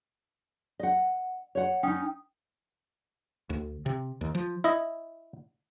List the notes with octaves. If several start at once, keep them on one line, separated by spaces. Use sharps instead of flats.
D#5 F#5
C#5 F#5
C#4 D#4 G5 D#6
D2
C3
D#2
F3
E4 D#5